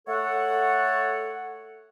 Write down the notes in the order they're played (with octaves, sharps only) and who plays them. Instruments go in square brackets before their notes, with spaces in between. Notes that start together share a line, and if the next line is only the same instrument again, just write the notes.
[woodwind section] A3 A4 C#5 F#5